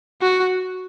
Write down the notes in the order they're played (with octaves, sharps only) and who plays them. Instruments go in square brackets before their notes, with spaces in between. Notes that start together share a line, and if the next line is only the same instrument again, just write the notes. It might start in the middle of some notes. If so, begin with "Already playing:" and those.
[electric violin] F#4